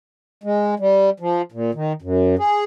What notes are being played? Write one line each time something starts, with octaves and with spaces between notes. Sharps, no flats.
G#3
G3
F3
A#2
D#3
F#2
G#4